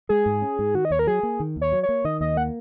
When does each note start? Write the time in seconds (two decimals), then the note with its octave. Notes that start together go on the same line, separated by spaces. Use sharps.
0.09 G#3 G#4
0.26 G#2
0.42 C#4
0.59 G#2
0.75 D#3 F#4
0.85 D#5
0.90 D#2 C#5
0.99 A#4
1.07 F#3 G#4
1.23 A#3
1.40 D#3
1.56 D#2
1.62 C#5
1.72 F#3
1.83 C#5
1.89 A#3
2.05 D#3 D#5
2.21 D#2 D#5
2.37 A#3 F#5